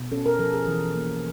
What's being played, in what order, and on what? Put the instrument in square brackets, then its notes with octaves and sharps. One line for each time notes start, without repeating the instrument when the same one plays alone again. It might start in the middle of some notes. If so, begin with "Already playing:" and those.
Already playing: [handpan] B2
C#4 A4
A#4
F3 A4
G#4
E3
A#3